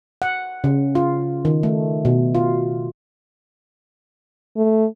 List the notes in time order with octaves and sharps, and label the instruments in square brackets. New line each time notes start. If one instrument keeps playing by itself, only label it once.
[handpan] F#5
C#3
F4
D#3
A3
B2
F4
[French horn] A3